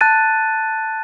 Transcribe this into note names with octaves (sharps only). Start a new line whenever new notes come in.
A5 F#6 A6 D#7